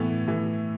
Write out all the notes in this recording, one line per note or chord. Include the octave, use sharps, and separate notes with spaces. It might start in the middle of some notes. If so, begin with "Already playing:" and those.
Already playing: A2 E3 B3
A2 E3